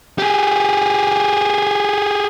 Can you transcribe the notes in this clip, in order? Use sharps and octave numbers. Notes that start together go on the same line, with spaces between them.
G4 G#4